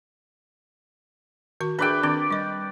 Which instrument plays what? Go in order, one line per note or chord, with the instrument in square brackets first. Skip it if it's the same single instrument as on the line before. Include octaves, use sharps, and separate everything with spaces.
[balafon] D#3 F#4 C#6
[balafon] D4 G#4 [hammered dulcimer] B4 D5 G5
[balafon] D#3 C4 D4 [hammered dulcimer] D5
[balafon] G3 D#5